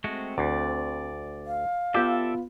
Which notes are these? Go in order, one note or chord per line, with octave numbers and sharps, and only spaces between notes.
G#3 A3 C4 F#4
D2 D5
F5
B3 F4 G4 A4 D5 E5